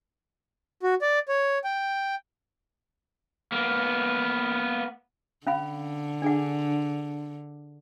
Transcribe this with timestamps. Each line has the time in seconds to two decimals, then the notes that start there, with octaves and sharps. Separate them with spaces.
0.83 F#4
1.02 D5
1.28 C#5
1.64 G5
3.52 A#3 B3
5.47 D3 C#4 F5 B5
6.22 D4 G#4 F#5